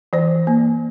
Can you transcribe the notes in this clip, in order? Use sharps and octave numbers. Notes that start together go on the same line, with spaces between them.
E3 C5
A#3